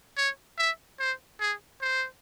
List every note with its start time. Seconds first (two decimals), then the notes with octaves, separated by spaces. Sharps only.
0.17 C#5
0.58 E5
1.00 C5
1.40 G#4
1.81 C5